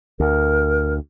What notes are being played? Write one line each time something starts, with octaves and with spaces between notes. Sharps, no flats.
D2 A#4